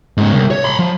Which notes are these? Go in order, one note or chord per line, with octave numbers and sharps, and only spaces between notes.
G#2 C#3
C2
C#5
B5 C6
F3